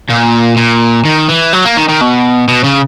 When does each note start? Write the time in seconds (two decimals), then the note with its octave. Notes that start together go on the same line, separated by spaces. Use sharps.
0.09 A#2
0.57 A#2
1.05 D#3
1.29 E3
1.53 F#3
1.65 A#3
1.77 D#3
1.88 D#3
2.01 B2
2.48 B2
2.64 C#3